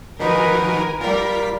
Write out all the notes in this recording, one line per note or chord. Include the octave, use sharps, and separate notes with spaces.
D#3 F3 D#4 F#4 A#4 B4 G#5
G3 F4 A#4 B6